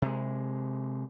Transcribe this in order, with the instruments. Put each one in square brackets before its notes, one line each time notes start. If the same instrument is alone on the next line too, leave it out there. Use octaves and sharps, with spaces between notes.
[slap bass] C3 G#3